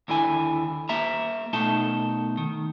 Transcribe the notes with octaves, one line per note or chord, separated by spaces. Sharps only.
D#2 D3 E4 G#5
A#3 E5 A#5
B2 A3 D#4 A5
D#3